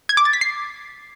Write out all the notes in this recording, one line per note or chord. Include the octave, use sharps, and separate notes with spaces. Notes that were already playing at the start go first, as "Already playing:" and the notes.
G#6
D6
A6
B6
C7